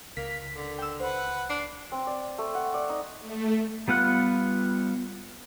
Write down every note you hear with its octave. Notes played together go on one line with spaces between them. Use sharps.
C#2 A#3 B6
D3
G5 E6
B4 C5 F#5
D4 C7
C4
D5
A3
F#5
D5
D#4
A3
G3 B3 F4 F#5